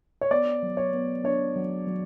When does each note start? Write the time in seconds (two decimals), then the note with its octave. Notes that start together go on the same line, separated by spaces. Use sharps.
0.21 C#5
0.31 B3 D5
0.62 F#3
0.77 C#5
0.93 B3
1.24 D4 C#5
1.56 F#3
1.87 F#3